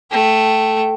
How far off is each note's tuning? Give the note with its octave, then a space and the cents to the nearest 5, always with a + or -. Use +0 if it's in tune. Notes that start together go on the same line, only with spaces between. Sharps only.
A3 +0 G5 -15